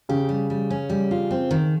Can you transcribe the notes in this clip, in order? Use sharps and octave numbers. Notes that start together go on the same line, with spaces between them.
C#3 G4
G3
G3
C#4
G3
F4
C4
D#3